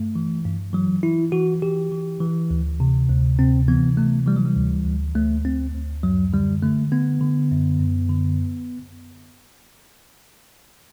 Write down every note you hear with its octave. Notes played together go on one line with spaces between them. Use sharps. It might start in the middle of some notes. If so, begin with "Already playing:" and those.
Already playing: G2 A3
E3
G2
E3 F#3
E3 E4
E3 F#4
E3 G4
E3
E3
D2
C3
D2
C3 C4
E3 B3
C3 A3
E3 G3
F#3
G3
D2
D2
D2 A3
D2 C4
D2
F#2 F#3
D3 G3
D3 A3
D3 B3
D3
F#2
F#2
D3